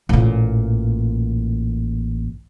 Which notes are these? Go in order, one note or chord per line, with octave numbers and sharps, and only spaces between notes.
A1 A#2